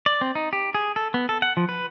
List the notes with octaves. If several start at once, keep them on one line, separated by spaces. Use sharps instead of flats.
D5
C4
D#4
G4
G#4
A4
B3
A4
F#5
F3
B4